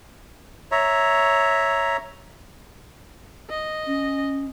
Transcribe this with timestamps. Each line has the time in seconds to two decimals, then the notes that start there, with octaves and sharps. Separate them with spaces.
0.72 C#5 E5 A#5
3.50 D#5
3.87 C#4